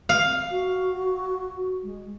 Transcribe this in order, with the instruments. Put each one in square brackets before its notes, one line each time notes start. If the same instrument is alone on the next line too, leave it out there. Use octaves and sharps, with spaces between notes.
[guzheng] F5
[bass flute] F#4
G#3